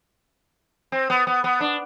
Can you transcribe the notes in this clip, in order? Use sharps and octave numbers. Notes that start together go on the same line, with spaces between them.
C4
B3
B3
B3
D4